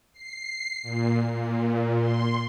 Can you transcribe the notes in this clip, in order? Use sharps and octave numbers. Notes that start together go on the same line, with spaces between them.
C7
A#2
A#2
C6